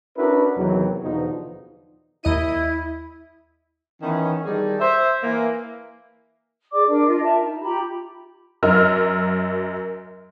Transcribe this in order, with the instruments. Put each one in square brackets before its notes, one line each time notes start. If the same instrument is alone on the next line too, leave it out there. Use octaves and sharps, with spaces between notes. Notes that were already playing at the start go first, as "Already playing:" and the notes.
[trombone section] C#4 D4 E4 F#4 A#4 B4
E2 C3 D#3 F#3
E2 B2 D3 F3 D#4
[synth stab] D#2 D#5 D#7 [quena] E4
[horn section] D#3 E3 B3 C#4
D#3 G3 D#4 G#4 A4 D5
C5 E5
E3 A#3
[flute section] G#4 D5 D6
D4 A#4
F4 D#5
A#4 E5 A5
D#4
F4 G4 A#5 B5
[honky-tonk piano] F#2 F#3 A#4 D#5 E6 F6